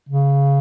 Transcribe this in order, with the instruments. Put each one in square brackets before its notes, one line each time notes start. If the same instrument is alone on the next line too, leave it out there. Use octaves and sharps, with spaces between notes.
[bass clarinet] C#3